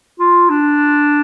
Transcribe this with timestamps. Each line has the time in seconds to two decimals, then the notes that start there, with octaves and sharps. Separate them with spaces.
0.20 F4
0.50 D4